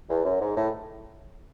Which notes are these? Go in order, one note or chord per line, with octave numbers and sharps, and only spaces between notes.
E2
F#2
G#2
A2